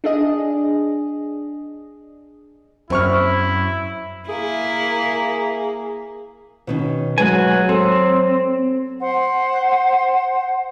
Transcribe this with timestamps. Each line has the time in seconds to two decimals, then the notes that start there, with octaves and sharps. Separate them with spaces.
0.04 D4 G#4 D#5
2.90 F#2 C4 E4 C#6 F6
4.29 A#3 E4 G#4
6.67 B2 D#3 C#4
7.18 F#3 G#3 F#4 B4 G#5
7.69 C4 A4
9.00 C5 F#5